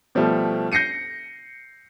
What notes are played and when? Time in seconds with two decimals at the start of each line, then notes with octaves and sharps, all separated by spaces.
0.15 B2 F3 G3 A3
0.72 G6 A#6 C7 C#7 D#7